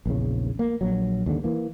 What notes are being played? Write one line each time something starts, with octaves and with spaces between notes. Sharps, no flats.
A#1 E2 C#3
A#3
A#1 F#3
D#2 G#2 D3
E3 A#3